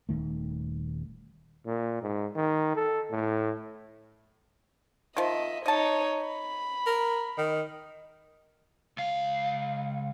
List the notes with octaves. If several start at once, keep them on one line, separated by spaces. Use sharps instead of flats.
D#1 C2 D#3 A3
A#2
G#2
D#3
A4
A2
D#3 F3 D#5 E5
D#4 C#5 D#5 A5
B5
A#4
D#3
C#2 F5